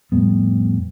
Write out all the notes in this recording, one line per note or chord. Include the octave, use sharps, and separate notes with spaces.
F2 A2 G3 B3